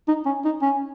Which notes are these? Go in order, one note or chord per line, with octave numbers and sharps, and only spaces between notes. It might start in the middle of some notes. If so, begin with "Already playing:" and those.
D#4
C#4
D#4
C#4